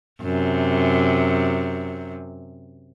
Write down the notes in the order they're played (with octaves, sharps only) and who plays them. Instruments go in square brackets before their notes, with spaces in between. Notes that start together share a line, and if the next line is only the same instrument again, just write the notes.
[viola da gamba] F#2 C3